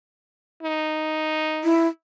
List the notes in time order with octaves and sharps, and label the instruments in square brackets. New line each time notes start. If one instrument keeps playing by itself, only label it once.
[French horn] D#4
[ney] E4